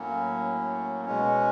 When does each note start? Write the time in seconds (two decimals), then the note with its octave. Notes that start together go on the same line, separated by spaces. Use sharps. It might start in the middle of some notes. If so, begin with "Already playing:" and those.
Already playing: A2 F#3 A#3 C#4
1.05 B2 G#3 C#4